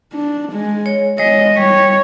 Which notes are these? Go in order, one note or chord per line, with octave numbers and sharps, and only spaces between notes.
D4
G#3
C#5
G#3 C#5 D#5
G3 C#5